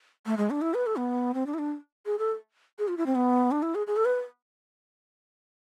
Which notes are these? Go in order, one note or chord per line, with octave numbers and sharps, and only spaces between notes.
A3
G#3
D4
E4
B4
A4
B3
C4
D4
E4
D4
G#4
A4
G#4
F4
E4
C4
B3
D4
E4
G#4
G#4
A4
B4